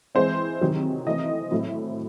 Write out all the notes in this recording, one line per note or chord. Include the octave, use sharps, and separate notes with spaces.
E3 G#3 C4 C5
C3 D#3 F#3
E3 A3 C4 D#5
A2 F#3 A3 C4